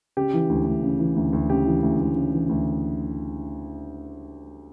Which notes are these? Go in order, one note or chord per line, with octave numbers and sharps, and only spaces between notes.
C#3 G4
E3
D2
D2
C#3
E3
D2
D2
C#3 G4
E3
D2
D2
C#3
E3
D2